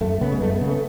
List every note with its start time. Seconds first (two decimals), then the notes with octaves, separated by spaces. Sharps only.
0.01 F#2 A3
0.21 C#3 B3
0.32 G#3
0.41 F#2 A3
0.54 B3
0.61 C#3
0.67 A3